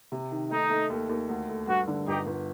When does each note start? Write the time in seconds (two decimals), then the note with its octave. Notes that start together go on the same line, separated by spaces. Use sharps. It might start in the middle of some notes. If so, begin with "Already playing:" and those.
0.12 C3
0.31 D#3
0.51 A3 D#4
0.70 A3
0.90 D#2
1.09 D#2
1.29 D2
1.48 A3
1.68 G2 F#4
1.88 D3
2.07 G1 D#4 G4
2.27 G1